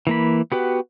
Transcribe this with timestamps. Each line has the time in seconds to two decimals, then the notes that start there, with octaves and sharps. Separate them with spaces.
0.07 E3 A#3 B5
0.52 B3 F#4 G4 B4